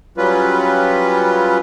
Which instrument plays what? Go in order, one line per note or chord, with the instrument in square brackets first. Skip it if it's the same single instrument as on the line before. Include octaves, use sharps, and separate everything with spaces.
[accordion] F#3 G3 C#4 F4 B4